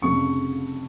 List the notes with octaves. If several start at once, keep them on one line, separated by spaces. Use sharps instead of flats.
F1 F2 C#3 C#6